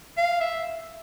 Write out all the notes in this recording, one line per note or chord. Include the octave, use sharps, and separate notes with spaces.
F5
E5